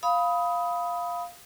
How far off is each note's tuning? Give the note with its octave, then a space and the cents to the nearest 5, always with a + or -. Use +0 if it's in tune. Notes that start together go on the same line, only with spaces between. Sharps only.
F5 +0 B5 +0 D#6 +20